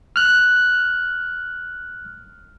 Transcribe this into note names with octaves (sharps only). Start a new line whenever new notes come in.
F6 F#6